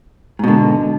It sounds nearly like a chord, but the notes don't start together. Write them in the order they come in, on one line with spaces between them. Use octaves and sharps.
G#2 B2 D3